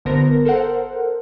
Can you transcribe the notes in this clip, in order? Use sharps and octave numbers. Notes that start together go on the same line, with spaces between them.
G1 D3 B3 A#4 C5 A#6
A4 A#4 C5 F#5